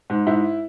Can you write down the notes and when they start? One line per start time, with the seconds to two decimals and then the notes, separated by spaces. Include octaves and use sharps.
0.10 G#2
0.27 G#2 E4